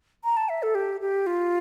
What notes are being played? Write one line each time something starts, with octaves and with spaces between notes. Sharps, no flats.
A#5
A5
E5
A4
G4
G4
F4